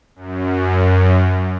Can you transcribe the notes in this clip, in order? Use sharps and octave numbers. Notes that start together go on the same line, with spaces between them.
F#2